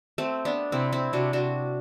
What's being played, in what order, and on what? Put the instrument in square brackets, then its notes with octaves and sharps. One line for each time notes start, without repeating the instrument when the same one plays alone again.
[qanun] A3 C4
B3 D4
[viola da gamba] C3 [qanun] C4 E4
[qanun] C4 E4
[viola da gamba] C3 [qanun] D4 F#4
[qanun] D4 F#4